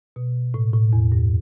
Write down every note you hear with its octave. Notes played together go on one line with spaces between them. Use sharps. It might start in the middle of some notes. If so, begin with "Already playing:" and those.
B2
A2
A2
E2
G2